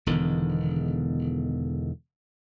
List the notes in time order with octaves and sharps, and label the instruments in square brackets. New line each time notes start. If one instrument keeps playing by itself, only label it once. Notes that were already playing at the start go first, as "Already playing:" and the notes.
[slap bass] E1 E2 D3 D#3